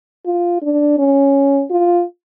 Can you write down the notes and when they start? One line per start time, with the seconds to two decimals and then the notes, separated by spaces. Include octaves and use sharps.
0.26 F4
0.62 D4
0.98 C#4
1.71 F4